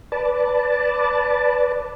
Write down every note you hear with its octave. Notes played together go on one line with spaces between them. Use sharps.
B4 D5 A5